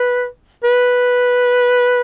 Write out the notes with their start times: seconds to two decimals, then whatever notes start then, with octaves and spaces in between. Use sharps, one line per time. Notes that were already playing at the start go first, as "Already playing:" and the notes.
Already playing: B4
0.64 B4